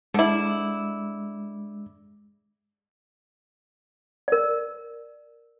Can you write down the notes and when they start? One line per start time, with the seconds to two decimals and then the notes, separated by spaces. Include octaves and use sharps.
0.14 D3 G#3 E4 D6
4.28 A#4 D5